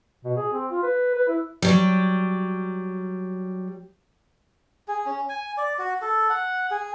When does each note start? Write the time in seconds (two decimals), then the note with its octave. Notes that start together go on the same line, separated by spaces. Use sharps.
0.25 B2
0.37 G#4
0.53 C4
0.71 F4
0.83 B4
1.15 B4
1.28 E4
1.62 F#3 G3
4.88 G#4
5.06 C#4
5.29 G#5
5.58 D5
5.79 F#4
6.02 A4
6.30 F#5
6.71 G#4